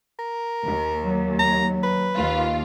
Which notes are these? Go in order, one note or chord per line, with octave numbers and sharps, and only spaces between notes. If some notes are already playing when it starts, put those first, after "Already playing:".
A#4
D#2
F#3
A#5
B4
D#2 F4